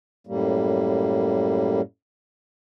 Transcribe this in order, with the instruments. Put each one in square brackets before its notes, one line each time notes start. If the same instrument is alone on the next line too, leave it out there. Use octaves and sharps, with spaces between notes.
[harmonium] F#2 A2 G3 A#3